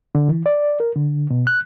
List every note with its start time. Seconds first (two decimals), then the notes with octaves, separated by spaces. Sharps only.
0.15 D3
0.29 E3
0.46 D5
0.80 A#4
0.96 D3
1.30 B2
1.47 F#6